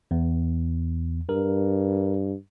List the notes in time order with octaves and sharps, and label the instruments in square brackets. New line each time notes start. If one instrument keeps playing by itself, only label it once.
[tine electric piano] E2
[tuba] G2 [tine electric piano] A#4